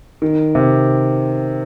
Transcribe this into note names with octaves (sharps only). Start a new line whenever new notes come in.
D#3
C3